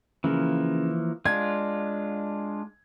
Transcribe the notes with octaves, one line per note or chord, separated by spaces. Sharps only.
C#3 E3 F3 A#3
G#3 D4 F4 G#6